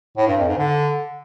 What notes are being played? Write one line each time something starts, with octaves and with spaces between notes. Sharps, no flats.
A2
G2
F2
G#2
D3